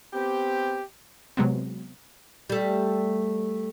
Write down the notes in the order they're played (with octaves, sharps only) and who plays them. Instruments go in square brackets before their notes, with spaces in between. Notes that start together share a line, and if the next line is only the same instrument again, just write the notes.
[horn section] B3 C4 G4
[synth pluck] C3 F#3 G#3 B3 C4
[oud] G3 A3